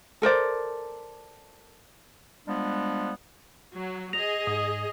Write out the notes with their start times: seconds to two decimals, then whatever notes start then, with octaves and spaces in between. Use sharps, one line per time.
0.22 A4 A#4 C5 D5
2.47 F3 G3 G#3 B3 D4
3.74 F#3
4.13 G#4 D#5 A#6 F7
4.47 G#2 D#6